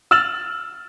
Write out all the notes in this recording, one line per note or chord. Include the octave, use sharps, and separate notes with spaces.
E6 F6 A6 E7 F#7